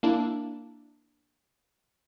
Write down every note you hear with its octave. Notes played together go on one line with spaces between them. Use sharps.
A#3 D4 E4